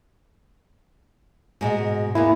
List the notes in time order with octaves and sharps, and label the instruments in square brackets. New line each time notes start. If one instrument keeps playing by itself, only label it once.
[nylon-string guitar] G#2 B2 G#3
[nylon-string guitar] E2 A#3 B3 [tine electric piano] E4